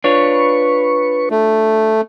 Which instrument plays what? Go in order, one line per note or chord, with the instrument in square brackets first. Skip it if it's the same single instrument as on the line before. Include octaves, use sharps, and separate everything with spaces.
[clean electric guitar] D4 F4 C#5 [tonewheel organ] B4 C#6
[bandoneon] A3